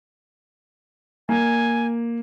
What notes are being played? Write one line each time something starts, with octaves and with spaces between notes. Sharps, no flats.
A#3 G#5